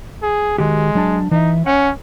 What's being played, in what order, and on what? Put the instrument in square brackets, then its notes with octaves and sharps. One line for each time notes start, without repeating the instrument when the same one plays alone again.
[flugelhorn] G#4
[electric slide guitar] D#3 F#4 G4 [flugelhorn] G#3
[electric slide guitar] F#3 D4 A5
[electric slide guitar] E3 E5 [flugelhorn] D#4
[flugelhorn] C#4 [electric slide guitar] C#5 F#5